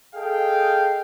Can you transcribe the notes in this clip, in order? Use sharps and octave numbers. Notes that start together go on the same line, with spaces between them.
G#4 A4 D#5 F5 G5